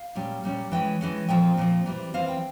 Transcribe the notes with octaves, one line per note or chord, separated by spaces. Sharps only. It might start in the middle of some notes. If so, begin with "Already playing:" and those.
Already playing: F5
A#2 G3 C#4
A#2 G3 C#4
E3 G#3 C#4 G5
E3 G#3 C#4
A#2 F3 C4 G5
A#2 F3 C4
E3 G3 C4
E3 G3 C4 F5
G5